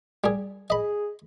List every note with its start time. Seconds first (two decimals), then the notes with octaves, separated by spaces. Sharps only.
0.24 G3 G#4
0.70 G#4 D#5 B5